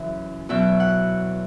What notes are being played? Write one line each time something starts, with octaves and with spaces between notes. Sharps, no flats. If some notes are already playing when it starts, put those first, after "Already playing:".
Already playing: F#2 C#3 E3 E5
E2 B2 F#3 E5
F#5